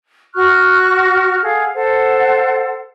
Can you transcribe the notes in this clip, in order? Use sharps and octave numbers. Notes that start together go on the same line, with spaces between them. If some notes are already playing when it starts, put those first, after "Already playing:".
F#4 C#6 F6 F#6
G#4 A4 F5 F#5
A4 C5 F#5